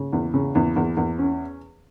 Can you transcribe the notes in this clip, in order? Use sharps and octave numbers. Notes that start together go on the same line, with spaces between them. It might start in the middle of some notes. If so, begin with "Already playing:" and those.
Already playing: C#3
E2
C#3
E2
E2
E2
C#4